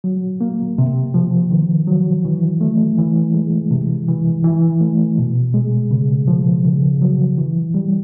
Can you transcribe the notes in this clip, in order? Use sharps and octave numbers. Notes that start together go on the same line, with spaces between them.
F#3
A#3
C3
F3
D#3
F#3
E3
A3
E3
G#3
C3
E3
E3
A3
B2
G#3
C#3
F3
C#3
F#3
E3
G3